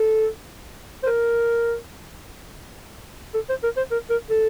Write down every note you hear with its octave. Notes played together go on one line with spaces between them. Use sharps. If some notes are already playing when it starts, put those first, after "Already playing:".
Already playing: A4
C5
A#4
A4
C5
A#4
C5
A#4
A#4
A4